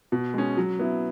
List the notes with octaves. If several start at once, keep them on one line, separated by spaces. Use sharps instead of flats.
B2
G#3 C#4
F#3
B3 E4